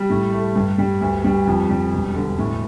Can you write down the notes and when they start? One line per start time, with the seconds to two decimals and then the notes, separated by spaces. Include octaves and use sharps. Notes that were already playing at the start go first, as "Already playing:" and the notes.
Already playing: G3
0.10 A2
0.32 A3
0.55 G2
0.78 G3
1.01 D2
1.24 G3
1.47 F2
1.70 G3
1.92 E1
2.15 D3
2.38 A2